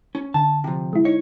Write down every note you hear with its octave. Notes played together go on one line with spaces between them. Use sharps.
C#4
D3 A5
C3 F3
G#3 E4
D#4 C#5